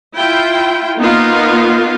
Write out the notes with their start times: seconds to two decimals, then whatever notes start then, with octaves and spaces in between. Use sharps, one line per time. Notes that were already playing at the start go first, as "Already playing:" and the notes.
0.14 E4 F4 G5
1.00 A#3 B3 D#4 F4